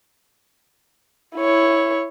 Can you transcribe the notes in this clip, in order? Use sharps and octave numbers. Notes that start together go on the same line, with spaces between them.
E4 C#5